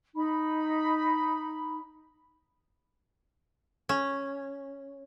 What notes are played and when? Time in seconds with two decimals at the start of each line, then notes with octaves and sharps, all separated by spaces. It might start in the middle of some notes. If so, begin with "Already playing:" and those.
0.15 D#4 B5
3.89 C#4